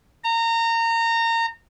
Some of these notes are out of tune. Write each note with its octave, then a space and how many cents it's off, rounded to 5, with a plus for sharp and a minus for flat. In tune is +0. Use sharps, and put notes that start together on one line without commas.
A#5 -25